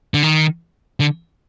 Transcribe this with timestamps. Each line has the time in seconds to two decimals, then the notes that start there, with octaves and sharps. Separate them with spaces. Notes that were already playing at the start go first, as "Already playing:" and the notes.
0.14 D3
0.23 D#3
1.00 D3